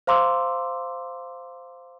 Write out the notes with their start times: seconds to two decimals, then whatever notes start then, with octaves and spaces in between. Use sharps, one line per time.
0.07 C5 F5 A#5 C6 D6 E6